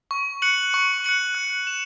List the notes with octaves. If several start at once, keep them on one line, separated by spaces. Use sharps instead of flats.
C#6
F#6 C#7 F#7
C#6
F#6 C#7 F#7
F#6
E7